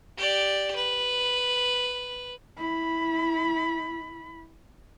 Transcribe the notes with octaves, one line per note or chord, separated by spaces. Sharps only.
G4 D5
B4
E4 B5